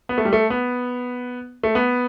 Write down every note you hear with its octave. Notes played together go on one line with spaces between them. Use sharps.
B3
A3
G3
A3
B3
A3
B3